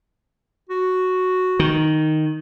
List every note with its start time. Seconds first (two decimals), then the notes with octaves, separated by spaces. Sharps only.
0.69 F#4
1.60 D#3